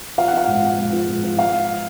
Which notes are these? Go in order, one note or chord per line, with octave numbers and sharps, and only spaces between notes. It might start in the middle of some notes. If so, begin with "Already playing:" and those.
F3 F5
F#5
F3 F5
G#2
F3
G#2
F3
G#2
F3
F3 F5